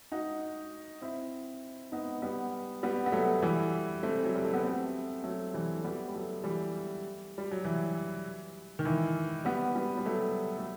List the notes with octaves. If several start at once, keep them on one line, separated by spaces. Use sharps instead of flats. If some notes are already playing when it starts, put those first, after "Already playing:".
D#4 F#4
C4 E4
B3 D#4
G3 B3
G3 B3
B3
F#3 A3
E3 G3
A3 C4
F#3
G3
A3
B3
A3 C4
F#3 A3
E3 G3
A3
G3 B3
G3
F#3 A3
E3 G3
G3
F#3
E3
D#3
E3
G3 B3
G3 B3
G3
F#3 A3
A3